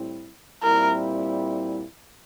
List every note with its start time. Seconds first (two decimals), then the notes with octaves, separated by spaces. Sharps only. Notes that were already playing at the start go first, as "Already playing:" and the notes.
Already playing: A2 G3 C4 E4
0.63 A#2 G3 C4 E4 A#4